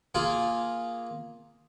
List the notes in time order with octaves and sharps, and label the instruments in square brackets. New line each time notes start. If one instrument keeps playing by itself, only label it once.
[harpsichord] A#3 F4 G#4